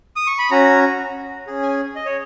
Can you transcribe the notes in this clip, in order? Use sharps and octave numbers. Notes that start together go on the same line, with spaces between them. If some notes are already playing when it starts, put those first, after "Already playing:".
D#6
C#6
B5
C#4 F#4 A#5
C#4 G#4
G#5
D#5
C#5